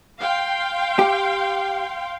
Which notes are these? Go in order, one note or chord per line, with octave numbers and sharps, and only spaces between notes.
F5 G5 C6
G4